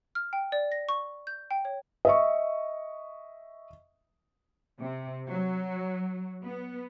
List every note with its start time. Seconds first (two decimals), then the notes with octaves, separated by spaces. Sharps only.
0.15 F6
0.33 G5
0.52 D5
0.72 A#6
0.89 C#6
1.27 G6
1.51 G5
1.65 C#5
2.05 D#5 E5 C#6
4.80 C3
5.29 F#3
6.43 B3